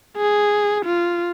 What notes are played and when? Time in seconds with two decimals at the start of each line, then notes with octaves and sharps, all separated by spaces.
0.17 G#4
0.85 F4